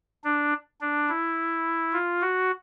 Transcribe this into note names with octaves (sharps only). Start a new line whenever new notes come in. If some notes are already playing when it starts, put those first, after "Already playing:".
D4
D4
E4
F4
F#4